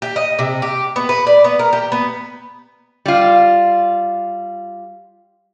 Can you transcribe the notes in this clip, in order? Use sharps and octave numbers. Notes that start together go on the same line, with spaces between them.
G4
D#5
C3
G4
B3
B4
D5
B3
A#4
G4
B3
G3 F4